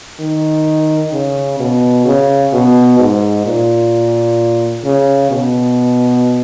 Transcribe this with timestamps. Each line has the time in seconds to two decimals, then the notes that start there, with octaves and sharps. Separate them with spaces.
0.20 D#3
1.13 C#3
1.59 B2
2.05 C#3
2.52 B2
2.99 G#2
3.45 A#2
4.84 C#3
5.31 B2